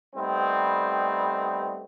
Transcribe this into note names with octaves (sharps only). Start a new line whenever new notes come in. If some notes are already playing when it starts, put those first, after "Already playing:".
G3 A3 B3 C4 D#4